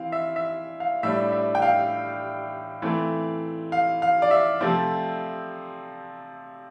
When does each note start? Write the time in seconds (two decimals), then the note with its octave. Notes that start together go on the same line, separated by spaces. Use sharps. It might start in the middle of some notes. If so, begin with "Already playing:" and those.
Already playing: E3 C4 F5
0.12 E5
0.36 E5
0.80 F5
1.03 A2 G3 D4 E5
1.32 E5
1.55 G5
1.62 F5
2.82 E3 A3 C4
3.72 F5
4.02 F5
4.22 D5
4.31 E5
4.61 C3 F3 A3 C4